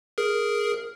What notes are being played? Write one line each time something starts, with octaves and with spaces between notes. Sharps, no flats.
G#4 A#4